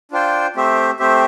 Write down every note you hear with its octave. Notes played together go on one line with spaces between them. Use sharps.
D4 F4 C5 G5
A3 C4 G4 C5 E5
A3 C4 G4 C5 E5